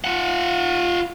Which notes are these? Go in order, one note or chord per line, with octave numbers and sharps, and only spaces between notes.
F4 F#5